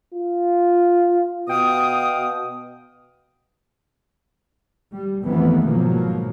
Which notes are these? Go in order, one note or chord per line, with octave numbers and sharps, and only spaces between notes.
F4
B2 F5 G5 D#6
G3
G#1 F2 D#3 E3 A3 B3
G#2 B2 F3 F#3 A#3